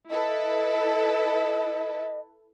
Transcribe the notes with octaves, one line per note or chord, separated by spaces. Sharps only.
E4 A4 B4 D#5